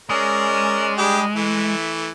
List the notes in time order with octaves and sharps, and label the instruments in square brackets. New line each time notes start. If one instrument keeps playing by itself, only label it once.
[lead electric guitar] G#3 [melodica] C#4 D5 [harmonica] A#4
[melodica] G3 G#4 [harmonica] D4 G4
[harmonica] E3 A3 [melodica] E5